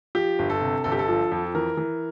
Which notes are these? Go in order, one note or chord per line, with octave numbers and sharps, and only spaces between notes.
F3 G4
G1
A4
C3
G1 A4
G4
A4
F3
F2
E3 A#4
E3